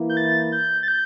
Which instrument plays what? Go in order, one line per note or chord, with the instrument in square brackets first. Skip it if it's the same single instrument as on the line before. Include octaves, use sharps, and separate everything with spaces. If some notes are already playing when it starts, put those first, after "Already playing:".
Already playing: [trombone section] E3 A#3 E4
[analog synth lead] G6
A6
G6
A6
G6